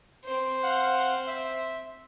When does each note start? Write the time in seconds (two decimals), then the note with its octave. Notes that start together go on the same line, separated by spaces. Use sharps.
0.24 C4 C5
0.63 F5 F#5
1.28 E5